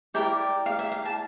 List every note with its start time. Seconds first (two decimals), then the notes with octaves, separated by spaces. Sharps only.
0.14 E4 G4 A#4 D5 G5
0.66 F5
0.79 E5
0.92 F5
1.05 A5